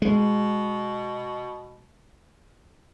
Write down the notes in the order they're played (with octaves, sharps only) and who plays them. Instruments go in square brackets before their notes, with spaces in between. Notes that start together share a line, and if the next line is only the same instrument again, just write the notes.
[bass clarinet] B2 [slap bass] G#3